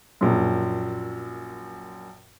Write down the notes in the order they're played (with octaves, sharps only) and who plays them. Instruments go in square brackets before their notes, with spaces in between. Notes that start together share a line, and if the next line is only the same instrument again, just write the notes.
[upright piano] A#1 F#2